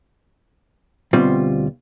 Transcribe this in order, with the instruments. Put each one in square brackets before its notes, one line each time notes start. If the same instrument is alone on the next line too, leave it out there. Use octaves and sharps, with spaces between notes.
[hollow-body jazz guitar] D2 B2 G3 C4 F4